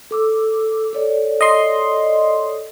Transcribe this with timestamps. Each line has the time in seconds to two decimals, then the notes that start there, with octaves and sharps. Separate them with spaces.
0.11 A4 D6 E6
0.93 A4 C#5 D5
1.41 D#5 C6